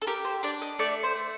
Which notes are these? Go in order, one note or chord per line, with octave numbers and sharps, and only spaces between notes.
A4
G4 A#4
C5
D4 D5
D#5
A3 D5
C5
A3